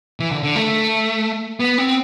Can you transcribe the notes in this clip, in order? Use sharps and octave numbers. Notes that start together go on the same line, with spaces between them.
E3
D3
D3
A3
B3
C4